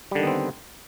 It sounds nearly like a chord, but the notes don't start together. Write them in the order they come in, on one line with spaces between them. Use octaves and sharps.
G3 D3 D#3 B3 C4